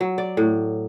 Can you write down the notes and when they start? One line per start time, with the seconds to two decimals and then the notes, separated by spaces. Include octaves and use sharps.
0.01 F#3
0.18 D5
0.37 A2